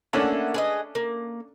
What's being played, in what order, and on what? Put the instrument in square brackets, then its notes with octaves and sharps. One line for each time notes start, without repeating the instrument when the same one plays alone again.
[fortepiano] A3 C#4 D4 [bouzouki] A#3 E4 F#5
[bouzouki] G#4 B4 D#5
A#3